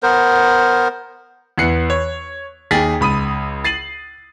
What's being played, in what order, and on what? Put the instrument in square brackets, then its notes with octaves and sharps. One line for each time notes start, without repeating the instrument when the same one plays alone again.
[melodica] B3 A#4 C5
[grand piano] E2 B3 F#6 C7 C#7
C#5
D#2 D#4 G#4 G5 A6 B6
C#2 B5 D#6 D#7
A6 C7 D#7 F#7